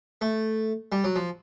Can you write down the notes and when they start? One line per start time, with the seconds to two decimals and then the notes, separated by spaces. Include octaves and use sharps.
0.21 A3
0.92 G3
1.04 F#3
1.16 F3